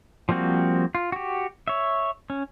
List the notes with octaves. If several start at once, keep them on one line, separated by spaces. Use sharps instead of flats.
F3 G3 A#3 C4 F#4
F4
F#4 G4
C#5 E5
C#4